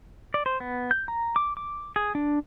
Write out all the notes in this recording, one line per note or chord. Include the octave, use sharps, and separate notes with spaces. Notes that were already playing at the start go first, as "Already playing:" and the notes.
D5
C5
B3
G6
A#5
D6
D6
G#4
D4